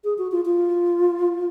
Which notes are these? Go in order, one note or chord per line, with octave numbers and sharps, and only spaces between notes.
G#4
F#4
F4
F4